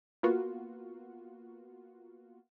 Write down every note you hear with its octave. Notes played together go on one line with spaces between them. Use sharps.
A#3 B3 F4 F#4